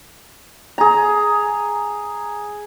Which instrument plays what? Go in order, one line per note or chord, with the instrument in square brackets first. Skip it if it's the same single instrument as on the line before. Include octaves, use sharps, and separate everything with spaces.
[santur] G#4 A#5